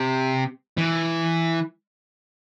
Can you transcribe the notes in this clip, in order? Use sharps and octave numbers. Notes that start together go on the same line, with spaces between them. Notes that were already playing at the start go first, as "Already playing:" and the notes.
Already playing: C3
E3